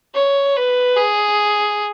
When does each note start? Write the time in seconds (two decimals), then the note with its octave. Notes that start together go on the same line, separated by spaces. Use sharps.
0.15 C#5
0.56 B4
0.97 G#4